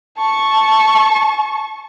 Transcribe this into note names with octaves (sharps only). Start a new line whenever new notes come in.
A5 C#6